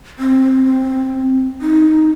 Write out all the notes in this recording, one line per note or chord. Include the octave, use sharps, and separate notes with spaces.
C4
D#4